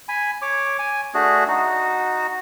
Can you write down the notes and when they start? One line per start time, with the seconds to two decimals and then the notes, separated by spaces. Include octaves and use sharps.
0.08 G#5 B5
0.42 C#5 D6
0.79 G#5
1.14 A3 D4 F#4 G#4
1.48 D#4 F#4